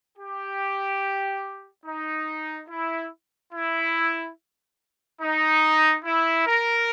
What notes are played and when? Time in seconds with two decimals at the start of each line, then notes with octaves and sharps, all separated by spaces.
0.18 G4
1.86 D#4
2.69 E4
3.53 E4
5.22 D#4
6.05 E4
6.47 A#4